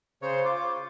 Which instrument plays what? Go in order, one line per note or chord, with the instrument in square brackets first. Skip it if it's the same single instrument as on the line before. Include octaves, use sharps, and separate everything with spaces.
[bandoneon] C#3 C#5 [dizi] C5
[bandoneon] F4 [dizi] D6